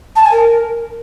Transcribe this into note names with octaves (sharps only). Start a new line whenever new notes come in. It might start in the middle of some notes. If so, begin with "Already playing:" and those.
A5
G#5
A#4